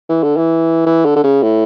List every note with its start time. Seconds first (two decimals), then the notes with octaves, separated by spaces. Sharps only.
0.09 E3
0.23 D3
0.37 E3
0.86 E3
1.05 D3
1.16 D3
1.24 C#3
1.43 A2